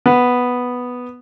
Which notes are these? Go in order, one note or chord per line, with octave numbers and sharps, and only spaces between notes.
B3